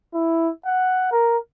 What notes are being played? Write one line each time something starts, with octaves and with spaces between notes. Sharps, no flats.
E4
F#5
A#4